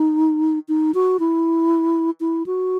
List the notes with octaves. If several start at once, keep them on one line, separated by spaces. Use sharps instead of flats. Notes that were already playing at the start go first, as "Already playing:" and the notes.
Already playing: D#4
D#4
F#4
E4
E4
F#4